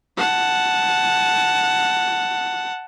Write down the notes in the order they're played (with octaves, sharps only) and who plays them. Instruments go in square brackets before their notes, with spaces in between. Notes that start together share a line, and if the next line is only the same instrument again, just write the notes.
[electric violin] F#5 A5